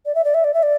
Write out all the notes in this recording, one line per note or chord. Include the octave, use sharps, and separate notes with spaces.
D5
E5
D5
E5
D5
E5
D5